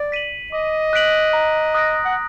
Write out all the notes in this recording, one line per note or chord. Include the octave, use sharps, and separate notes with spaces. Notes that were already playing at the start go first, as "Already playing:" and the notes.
Already playing: D5
B6 D#7 F#7
D#5 D6
F#6 B6 D7 F#7
A#5
D#6 F#6 A#6 D7
F#5